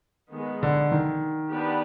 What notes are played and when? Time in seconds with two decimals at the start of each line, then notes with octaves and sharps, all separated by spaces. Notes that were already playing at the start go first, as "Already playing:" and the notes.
0.32 D#3 G#3 B3
0.63 D3
0.92 D#3
1.52 B3 D4 G4 B4